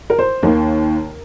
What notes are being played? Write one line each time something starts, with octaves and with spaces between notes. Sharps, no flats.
A#4
C5
D#2 D#3 A#3 A#4